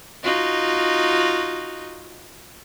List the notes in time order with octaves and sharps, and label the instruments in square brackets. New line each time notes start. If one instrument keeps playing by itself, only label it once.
[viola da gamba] D#4 F4 F#4